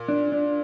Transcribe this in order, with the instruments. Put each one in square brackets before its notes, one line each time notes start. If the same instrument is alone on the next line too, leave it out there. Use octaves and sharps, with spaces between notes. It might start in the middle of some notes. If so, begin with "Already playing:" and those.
Already playing: [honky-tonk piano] A#2
[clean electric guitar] D4
D4